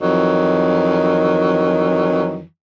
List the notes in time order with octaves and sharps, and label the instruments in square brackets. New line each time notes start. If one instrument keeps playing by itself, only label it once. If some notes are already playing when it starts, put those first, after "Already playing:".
[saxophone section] F2 D#3 E3 F#3